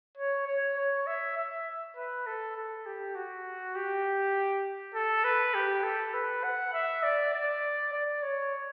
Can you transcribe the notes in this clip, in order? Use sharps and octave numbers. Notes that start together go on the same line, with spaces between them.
C#5
C#5
C#5
E5
E5
B4
A4
A4
G4
F#4
G4
A4
B4
G4
A4
B4
F#5
E5
D5
D5
D5
C#5